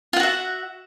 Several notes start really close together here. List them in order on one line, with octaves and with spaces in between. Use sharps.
F4 F#5 F#4 E5